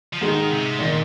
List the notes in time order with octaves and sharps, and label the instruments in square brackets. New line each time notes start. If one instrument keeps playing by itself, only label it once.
[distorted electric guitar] F3
[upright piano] G#2 G#3 D#4 [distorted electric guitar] D#3
[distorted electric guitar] C3
[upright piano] G#1 D#3 [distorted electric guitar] A#2